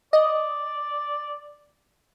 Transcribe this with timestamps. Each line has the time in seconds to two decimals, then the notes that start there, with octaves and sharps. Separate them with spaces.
0.13 D5 D#5